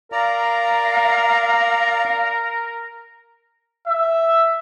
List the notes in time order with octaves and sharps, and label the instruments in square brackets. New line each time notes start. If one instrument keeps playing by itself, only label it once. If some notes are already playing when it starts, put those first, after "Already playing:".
[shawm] A#4 [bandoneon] D5 A#5 [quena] F5
[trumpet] E5